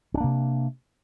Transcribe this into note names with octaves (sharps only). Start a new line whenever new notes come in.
C3 A#3 C#4 D4